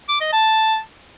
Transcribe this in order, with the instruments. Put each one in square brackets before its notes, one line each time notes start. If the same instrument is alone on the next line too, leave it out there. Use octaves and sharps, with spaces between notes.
[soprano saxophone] D6
D#5
A5